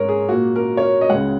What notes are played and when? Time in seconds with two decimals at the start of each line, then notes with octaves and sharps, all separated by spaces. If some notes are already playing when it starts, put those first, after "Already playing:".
Already playing: G#2 G#3 A#4 C#5
0.09 G#4
0.29 A#2 A#3 F#4
0.56 A#4
0.77 C#5
0.83 A#4
1.01 D#5
1.09 C#2 C#3 G#3 F#5